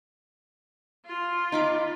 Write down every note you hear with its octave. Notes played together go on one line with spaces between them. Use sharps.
F4
D#4 B5 D6